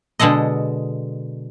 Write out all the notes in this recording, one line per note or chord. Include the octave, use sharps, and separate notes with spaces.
B2 D3 G#3 A4 D#5